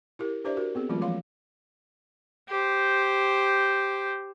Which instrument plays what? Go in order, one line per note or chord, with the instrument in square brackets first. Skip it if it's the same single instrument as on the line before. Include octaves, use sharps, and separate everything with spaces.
[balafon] E4 G4 A#4
D4 G4 B4 C5 D5 E5
F#4 A#4
B3 C4 G#4
E3 F#3 G#3 A3 C#4 F4
F3 F5 C6
[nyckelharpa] G4 C5